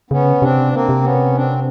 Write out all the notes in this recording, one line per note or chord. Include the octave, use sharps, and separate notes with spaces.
C#3 B3 C#4
C3 C4 D4
A#3 C4
C3
B3 C#4
C4 D4